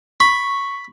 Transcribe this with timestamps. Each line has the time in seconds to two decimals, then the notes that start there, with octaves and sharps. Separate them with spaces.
0.20 B5 C#6